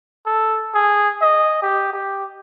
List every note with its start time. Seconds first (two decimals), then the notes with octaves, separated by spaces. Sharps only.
0.26 A4
0.74 G#4
1.22 D#5
1.62 G4
1.93 G4